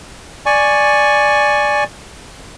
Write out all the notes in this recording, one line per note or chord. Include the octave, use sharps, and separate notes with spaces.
D5 G#5 C#6